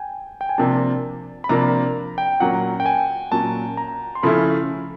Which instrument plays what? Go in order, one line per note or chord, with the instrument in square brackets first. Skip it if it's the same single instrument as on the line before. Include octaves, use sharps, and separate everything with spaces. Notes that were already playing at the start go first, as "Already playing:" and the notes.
Already playing: [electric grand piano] G5 G#5
G5
G#5
[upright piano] C3 F3 A#3 D4 [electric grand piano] A5
[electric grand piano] B5
[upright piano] C3 F3 A#3 D4 [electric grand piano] A#5
[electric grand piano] G5
[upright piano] A#2 F#3 A#3 C#4 [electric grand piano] F#5
[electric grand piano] G5
G#5
[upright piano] A#2 F#3 A#3 C#4 [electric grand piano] A5
[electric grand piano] A#5
C6
[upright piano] C#3 F3 A3 C#4 E4 [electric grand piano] B5